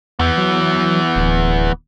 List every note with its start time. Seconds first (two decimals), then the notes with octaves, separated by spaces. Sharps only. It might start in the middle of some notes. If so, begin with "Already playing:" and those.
0.19 E2 E3 B3
0.38 F#3
1.16 D1